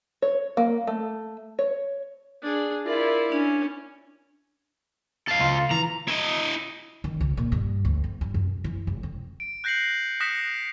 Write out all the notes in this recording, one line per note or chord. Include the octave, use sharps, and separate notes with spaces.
C#5
A#3
A3
C#5
D4 G#4
E4 F4 A#4 D5
C#4 D4
A4 F5
C#2 F4
E3 A#5
E4 D#5
D#3
C#2
A#2
G2
D2
C4
G2
F#2
E3
F1
C4
D7
F#6 G6 A#6 C7 C#7 F#7
D#6 F#6 A#6 B6 C#7 E7